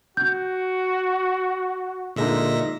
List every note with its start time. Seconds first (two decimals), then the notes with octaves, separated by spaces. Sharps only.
0.17 F#4 G6
2.16 A#2 D3 G#3 D#4 E5 A#6